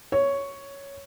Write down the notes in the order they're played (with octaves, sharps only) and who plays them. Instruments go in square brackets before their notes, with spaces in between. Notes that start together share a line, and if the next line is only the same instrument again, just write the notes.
[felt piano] C#5